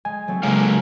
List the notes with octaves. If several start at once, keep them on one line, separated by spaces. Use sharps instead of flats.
G#3 G#5
F#3 A3 C4
C#3 F#3 G#3 A#3 D4 F5